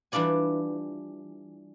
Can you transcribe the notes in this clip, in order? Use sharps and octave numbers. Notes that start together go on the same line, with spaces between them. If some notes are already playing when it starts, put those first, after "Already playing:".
E3 G3 D4 F4 D5 G#5